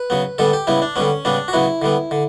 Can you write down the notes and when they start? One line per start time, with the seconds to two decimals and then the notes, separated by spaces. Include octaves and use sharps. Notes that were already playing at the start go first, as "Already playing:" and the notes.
Already playing: B4
0.10 C#3 F#3 B3
0.38 D3 G3 B3 A4
0.53 G4
0.67 C#3 G3 B3 E4
0.82 D4
0.96 D3 G3 B3 C#4
1.25 C#3 G3 B3 D4
1.48 F#4
1.53 C#3 F#3 B3 E4
1.82 D3 G3 B3
2.11 D3